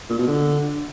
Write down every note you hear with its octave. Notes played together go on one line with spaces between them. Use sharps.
A#2
B2
D3